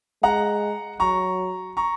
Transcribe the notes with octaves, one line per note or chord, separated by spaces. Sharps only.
G#3 F#5 A#5
F#3 A#5 C#6
A#5 C#6